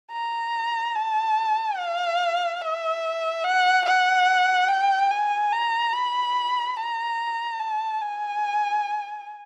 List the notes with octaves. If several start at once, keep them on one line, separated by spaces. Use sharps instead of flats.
A#5
A5
F5
E5
F#5
F#5
G5
G#5
A#5
B5
A#5
A5
G#5